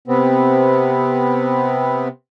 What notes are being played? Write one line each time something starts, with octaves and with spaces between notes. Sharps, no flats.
C3 B3 C4